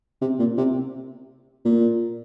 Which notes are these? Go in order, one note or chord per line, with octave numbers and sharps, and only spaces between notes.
C3
A#2
C3
A#2